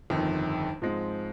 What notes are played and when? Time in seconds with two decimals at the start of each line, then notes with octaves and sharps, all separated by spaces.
0.10 G1 F2 D#3
0.82 G#2 F3 G#3 C4